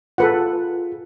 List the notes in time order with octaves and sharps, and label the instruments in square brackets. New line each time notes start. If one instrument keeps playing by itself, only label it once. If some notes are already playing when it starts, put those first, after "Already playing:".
[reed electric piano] F4 G#4 [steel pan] A4 B4 F#5